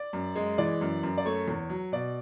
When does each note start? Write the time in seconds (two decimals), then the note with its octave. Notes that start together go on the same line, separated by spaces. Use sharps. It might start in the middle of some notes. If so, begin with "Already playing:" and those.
Already playing: D5
0.13 F#2
0.35 G#3
0.58 E3 D5
0.81 F#2
1.03 F#2
1.18 D5
1.25 A3 C#5
1.48 E2
1.69 F#3
1.92 B2 D5